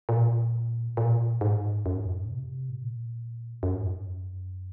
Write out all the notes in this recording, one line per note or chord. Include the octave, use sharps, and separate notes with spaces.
A#2
A#2
G#2
F#2
G#2
F#2
A#2
C3
G#2
A#2
F#2
G#2
F#2